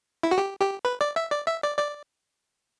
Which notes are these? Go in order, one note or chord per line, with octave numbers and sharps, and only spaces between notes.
E4
F#4
G4
G4
B4
D5
E5
D5
E5
D5
D5